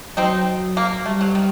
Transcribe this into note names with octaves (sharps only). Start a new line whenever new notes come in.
F#3 C4 D#4
A#3
G3 A3
F#3
D#3